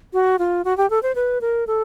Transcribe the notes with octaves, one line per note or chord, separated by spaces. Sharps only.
F#4
F4
F#4
G4
A4
C5
B4
A#4
A4